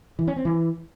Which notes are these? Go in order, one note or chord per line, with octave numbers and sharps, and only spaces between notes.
E3
C#4
C4
E3